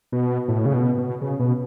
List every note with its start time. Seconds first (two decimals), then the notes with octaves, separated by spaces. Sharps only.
0.12 B2
0.48 A2
0.66 C#3
0.73 B2
0.98 B2
1.21 C#3
1.39 B2